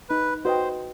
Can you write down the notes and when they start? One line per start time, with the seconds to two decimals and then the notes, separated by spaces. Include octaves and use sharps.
0.09 D#4 B4
0.44 F#4 B4 C5 D#5 G5